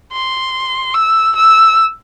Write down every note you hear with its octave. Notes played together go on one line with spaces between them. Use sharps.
C6
E6
E6